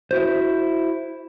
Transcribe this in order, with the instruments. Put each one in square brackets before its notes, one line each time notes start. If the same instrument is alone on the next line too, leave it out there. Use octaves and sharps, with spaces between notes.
[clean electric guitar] E4 F#4 C5